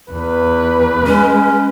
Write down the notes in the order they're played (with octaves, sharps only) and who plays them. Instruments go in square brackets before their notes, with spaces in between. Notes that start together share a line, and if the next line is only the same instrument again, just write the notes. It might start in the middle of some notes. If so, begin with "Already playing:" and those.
[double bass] E2 [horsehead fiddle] B4
[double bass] G#3 [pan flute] C#4